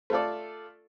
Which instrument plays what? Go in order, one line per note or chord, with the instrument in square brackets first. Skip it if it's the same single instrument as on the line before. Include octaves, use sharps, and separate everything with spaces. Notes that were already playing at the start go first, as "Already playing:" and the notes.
[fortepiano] A3 F4 A4 D5